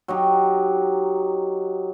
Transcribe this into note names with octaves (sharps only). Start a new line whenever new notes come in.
F#3 D#4 G4